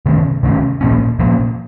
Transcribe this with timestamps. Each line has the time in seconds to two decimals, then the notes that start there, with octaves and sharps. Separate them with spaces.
0.06 C3 D#3 A3 C#4
0.43 C3 D#3 A3 C#4
0.81 A#2 F3 A#3 C#4
1.19 A#2 F3 A#3 C#4